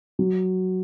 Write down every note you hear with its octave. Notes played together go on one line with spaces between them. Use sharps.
F#3